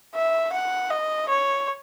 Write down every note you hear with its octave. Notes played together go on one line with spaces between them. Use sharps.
E5
F#5
D#5
C#5